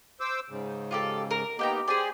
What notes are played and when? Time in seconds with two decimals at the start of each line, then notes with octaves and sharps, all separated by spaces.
0.20 C5 D6 E6
0.50 G#2 C#3
0.91 F4 G4 A4
1.31 A#4
1.59 A#3 B3 D#4 G4 G5 A#5
1.88 G4 G#4 C5 D5 G#5